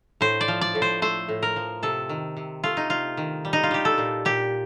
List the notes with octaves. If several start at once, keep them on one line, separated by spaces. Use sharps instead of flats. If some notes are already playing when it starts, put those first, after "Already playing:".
A2 C5
D5
F3
D5
A2
C5
A3 C5
A2
A#4
F3
C3 A4
D#3
C3
A3 F4
D#4
C3 F4
D#3
G3
D#4
F4
G3 G4
A4
A#2
A#2 G4